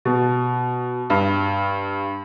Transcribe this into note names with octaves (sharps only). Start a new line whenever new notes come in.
B2
G2